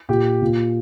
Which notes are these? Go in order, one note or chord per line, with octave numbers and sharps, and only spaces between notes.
A#2 G4
A#2